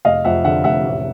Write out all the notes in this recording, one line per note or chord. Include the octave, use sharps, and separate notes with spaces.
F1 D#5 F5
F2 E5 F#5
D3 E5 F#5
F1 E5 F#5
A1